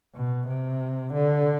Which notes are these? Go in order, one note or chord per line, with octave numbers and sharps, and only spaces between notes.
B2
C3
D3